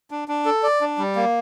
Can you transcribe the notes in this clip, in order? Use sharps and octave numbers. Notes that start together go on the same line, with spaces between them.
D4
D4
A4
D5
D4
G3
A#3